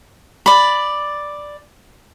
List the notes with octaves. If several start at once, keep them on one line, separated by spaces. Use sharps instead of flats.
D5 B5